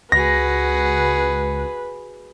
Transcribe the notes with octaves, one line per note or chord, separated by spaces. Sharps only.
C#2 F#4 G#4 B4 A#6